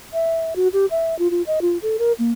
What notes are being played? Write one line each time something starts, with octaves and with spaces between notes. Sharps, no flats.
E5
F#4
G4
E5
F4
F4
D#5
F4
A4
A#4
A#3